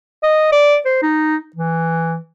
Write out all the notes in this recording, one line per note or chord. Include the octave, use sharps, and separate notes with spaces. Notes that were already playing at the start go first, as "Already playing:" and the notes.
D#5
D5
C5
D#4
E3